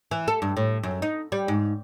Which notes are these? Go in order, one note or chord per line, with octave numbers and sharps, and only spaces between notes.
E3
A4
G2
A2
F#2
D#4
G3
G#2